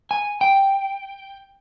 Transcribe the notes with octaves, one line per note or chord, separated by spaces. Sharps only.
G#5
G5